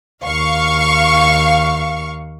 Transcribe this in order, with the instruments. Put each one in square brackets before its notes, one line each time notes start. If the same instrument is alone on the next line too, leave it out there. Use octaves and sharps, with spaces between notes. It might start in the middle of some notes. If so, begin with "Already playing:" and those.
[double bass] D#2 [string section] F5 C#6